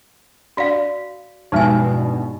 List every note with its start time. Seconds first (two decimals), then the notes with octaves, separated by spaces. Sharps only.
0.57 D4 F#4 D5 F5
1.52 E2 G2 B2 F3 G#3 D#4 G#5